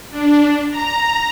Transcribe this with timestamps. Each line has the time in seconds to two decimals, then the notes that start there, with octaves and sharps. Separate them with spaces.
0.10 D4
0.70 A#5